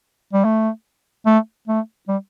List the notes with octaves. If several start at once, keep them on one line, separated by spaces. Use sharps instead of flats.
G3
A3
A3
A3
G3